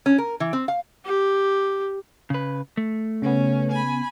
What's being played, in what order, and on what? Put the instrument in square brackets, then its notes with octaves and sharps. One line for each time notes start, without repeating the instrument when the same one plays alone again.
[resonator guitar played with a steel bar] C#4
A#4
E3
C4
F5
[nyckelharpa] G4
[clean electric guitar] C#3 B4
A3
[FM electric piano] C#3 B3 [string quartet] C#4
[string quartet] G#5 B5